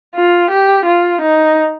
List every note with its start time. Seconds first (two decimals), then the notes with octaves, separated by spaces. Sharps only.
0.15 F4
0.50 G4
0.85 F4
1.21 D#4